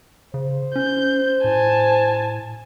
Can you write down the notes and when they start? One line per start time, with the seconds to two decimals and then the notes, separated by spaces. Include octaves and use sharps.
0.34 C#3 C5
0.76 C#4 G6
1.44 A2 G#5 A5